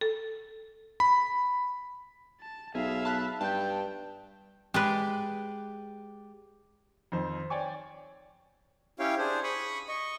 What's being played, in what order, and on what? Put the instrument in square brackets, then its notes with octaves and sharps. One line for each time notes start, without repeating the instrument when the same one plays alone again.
[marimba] A4
[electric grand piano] B5
[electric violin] A5
[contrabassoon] B1 [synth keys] G#4 [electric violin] E5 F5
[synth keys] A5 B5 F#6
[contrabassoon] G2 [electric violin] G5 [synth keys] A5 G6
[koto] G#3 B4 [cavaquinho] G4 D5
[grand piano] F2 D#3 C5
C#5 D5 G5 G#5 C#6
[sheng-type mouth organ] C#4 E4 G4 C#5 F5 G5
D4 G#4 C5
B5 C#6 D#6
D#5 C#6